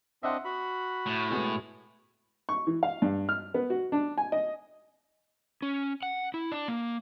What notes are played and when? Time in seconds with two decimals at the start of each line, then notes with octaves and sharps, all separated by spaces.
0.23 C4 D4 D#5 E5 F#5 C6
0.45 F#4 B5
1.06 A2
1.30 B2 G#3 B3
2.49 C#6
2.67 E3
2.83 F5
3.02 G2
3.29 F6
3.54 B3
3.70 F#4
3.92 D4
4.18 G#5
4.32 D#5
5.62 C#4
6.03 F#5
6.34 E4
6.52 D4
6.68 A#3